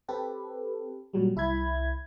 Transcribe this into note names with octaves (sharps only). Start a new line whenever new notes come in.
C4 G4 A4 B4
A#2 F#3 G3
C2 E4 E5 B5 G#6